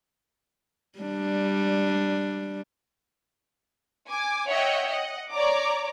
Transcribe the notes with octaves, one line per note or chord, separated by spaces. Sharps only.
G3 D4
G#5 D6
C#5 D#5 E5 F#5 G5
D#5 F#5
C#5 D5 A#5 D6